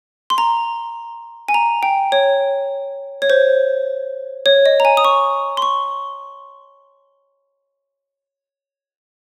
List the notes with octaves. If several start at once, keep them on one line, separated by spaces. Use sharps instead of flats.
C6
A#5
G#5
A#5
G5
C#5
C#5
C5
C#5
D#5
A#5
G#5
D#6
C#6
C6
C#6